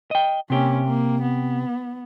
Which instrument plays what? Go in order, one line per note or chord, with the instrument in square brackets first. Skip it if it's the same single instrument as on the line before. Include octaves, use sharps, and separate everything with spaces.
[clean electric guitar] D#5 G5
[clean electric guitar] C3 G4 [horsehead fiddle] A#3 C#4
[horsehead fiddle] A#3
B3